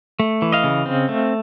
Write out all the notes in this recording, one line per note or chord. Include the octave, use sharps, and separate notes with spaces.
A3
E3
D#5 F5
C#3
C4
A3